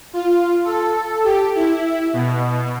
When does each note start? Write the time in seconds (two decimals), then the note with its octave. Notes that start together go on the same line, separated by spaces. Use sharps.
0.13 F4
0.65 A4
1.24 G4
1.55 E4
2.13 B2